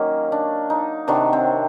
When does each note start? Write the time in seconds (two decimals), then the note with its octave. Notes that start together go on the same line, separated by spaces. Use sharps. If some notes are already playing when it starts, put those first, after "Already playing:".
Already playing: D#3 F#3 A#3 C#4
0.32 D4
0.70 D#4
1.08 C3 D#3 F#3 D4
1.33 C4